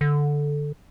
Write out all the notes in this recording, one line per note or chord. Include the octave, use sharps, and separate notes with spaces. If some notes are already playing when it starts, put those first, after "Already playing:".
D3